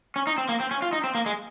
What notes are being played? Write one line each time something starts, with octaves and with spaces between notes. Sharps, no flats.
C#4
D#4
C4
A#3
C4
C#4
F4
D#4
C4
A#3
G#3